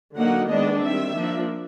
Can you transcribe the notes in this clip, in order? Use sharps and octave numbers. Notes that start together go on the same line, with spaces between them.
D3 F#3 A#3 D#4 F#5
D#3 G#3 B3 D4 D#5
D#3 G3 C4 E5
F3 A#3 D4